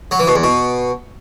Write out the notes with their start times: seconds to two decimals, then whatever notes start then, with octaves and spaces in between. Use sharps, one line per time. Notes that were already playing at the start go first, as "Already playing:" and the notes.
0.11 F#3
0.19 E3
0.27 B2
0.35 E2
0.43 B2